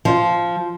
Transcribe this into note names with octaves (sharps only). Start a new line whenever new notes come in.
F3